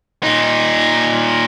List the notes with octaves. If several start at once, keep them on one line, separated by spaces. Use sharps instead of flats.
A#2 D#4